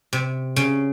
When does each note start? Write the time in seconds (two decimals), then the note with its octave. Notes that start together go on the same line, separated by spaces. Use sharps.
0.13 C3
0.56 C#3